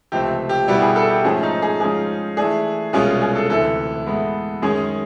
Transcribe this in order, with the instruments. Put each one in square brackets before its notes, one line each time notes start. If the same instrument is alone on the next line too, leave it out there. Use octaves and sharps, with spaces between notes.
[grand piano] C#2 C3 F3 A3 C4 [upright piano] G4
[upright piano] G4
[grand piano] B2 G3 B3 E4 [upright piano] G4
[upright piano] G#4
A4
G4
[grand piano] G#2 F3 A3 C#4 [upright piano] G#4
[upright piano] D#4
G#4
[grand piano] G#2 F3 G#3 C#4 F4 [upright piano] G#4
[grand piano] E3 A3 D4 [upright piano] G#4
[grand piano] C2 B2 G#3 C#4 F4 [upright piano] G#4
[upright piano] G#4
A4
[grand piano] D2 C3 E3 [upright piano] A4
[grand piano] A2 E3 G#3 B3
[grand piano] F#2 D#3 G#3 C#4 [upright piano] G#4